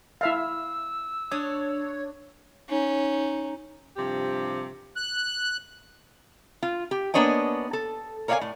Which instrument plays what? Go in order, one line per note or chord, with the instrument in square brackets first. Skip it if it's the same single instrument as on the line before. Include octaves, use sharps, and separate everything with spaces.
[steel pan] E4 E5 F5 [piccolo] E6
[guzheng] D4 [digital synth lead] C#5 [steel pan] D#6
[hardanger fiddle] C#4 [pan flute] D#4
[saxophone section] G2 C3 F3 G4
[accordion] F#6
[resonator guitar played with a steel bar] F4
G4
A#3 B3 D4 C#5 D#5 G#5
A4
A#4 C#5 D5 E5 F5 G#5
A2